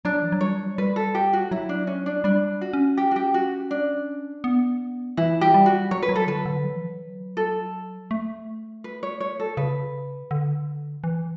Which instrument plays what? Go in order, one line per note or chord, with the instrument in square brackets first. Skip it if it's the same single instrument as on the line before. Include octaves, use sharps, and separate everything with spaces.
[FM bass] F#3 [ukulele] D4
[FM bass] E3
F#3
[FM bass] G3 [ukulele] C#5
[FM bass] G3 [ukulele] B4
[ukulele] A4
G4
F#4
[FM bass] F#3 [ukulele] E4
[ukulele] D4
C#4
D4
[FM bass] G3 [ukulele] D4
[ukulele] F#4
[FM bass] C#4
[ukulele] G4
F#4
G4
F#4
D4
[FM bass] B3
[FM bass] E3 [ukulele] E4
[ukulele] G4
[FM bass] G3
[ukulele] F#4
[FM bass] F#3 [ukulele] C#5
[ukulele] B4
[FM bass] F#3
[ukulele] A4
[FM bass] D3 [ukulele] B4
[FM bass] D3
F#3
E3
F#3
[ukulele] A4
[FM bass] A3
[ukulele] B4
C#5
C#5
A4
[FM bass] C#3 [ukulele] B4
[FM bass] D3
E3